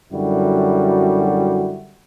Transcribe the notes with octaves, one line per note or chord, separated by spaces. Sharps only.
F#2 D3 G3 E4 F#4